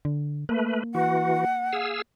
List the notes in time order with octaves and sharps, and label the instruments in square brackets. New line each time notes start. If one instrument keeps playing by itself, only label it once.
[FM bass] D3
[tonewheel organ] A3 B4 [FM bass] A#3
[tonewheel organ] E3 F#4 [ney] F#5
[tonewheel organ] G#4 F5 E6